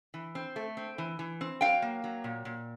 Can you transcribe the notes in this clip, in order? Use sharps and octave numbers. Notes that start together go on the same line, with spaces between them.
E3
C4
A3
C4
E3
E3
C4
F#3 F5 G5
A#3
F#3
A#2
A#2